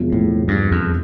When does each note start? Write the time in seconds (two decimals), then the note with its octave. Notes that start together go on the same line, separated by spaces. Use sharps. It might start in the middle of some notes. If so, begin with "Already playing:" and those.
Already playing: E1 E2 C3 F3
0.13 A2
0.48 G2
0.71 F2